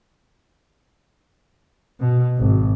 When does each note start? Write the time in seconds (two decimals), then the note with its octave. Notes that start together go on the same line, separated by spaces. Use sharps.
2.00 B2
2.38 G#1